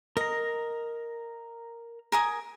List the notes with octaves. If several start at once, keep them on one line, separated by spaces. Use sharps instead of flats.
A#4 D#5 A#5
A#4 G#5 D#6